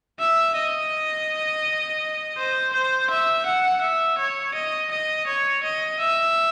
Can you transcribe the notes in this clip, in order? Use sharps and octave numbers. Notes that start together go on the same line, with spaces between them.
E5
D#5
C5
C5
E5
F#5
E5
C#5
D#5
D#5
C#5
D#5
E5